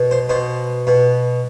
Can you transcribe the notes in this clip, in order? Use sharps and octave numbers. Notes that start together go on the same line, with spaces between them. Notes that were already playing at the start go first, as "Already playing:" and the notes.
Already playing: B2
C5
B2 C5
B2